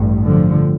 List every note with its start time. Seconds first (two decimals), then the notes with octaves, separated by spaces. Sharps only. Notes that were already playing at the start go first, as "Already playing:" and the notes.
Already playing: A1 G2
0.25 D3 F3